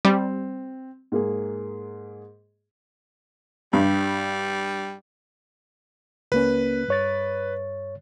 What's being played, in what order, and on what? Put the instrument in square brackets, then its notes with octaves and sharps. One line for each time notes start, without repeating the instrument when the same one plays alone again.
[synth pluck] G3 [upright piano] C4
[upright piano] G#2 A#3 G#4
[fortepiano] G2 [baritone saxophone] G3
[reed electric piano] C#2 A#3 C#4 [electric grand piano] B4
[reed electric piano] G2 C#5 A6